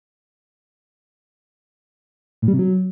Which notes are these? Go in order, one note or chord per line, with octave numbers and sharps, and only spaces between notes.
A2
G3
C3
F#3